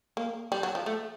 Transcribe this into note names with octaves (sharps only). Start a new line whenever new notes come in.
A#3
G3
F#3
F3
A3